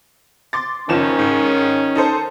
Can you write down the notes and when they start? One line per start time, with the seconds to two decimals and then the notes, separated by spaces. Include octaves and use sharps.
0.53 C6 D6 A6
0.89 F#1 D#3 F3 C#4 E7
1.19 G#2
1.95 D#4 A4 C5